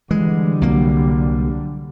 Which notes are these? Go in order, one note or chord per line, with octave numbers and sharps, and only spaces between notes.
D3 E3 G3 G#3
C2 F#3 A#3